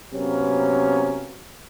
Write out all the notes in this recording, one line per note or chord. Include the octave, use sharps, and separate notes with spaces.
C3 F#3 A#3 B3 C#4